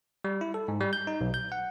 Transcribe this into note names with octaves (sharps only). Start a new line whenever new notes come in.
G3
E4
A4
G#2
G3
G6
D#4
B1
G6
F#5